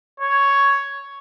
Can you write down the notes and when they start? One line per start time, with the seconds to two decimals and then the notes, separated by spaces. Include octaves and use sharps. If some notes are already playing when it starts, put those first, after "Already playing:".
0.20 C#5